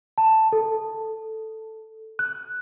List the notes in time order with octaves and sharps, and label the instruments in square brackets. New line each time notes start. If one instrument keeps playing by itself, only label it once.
[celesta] A5
A4
F#6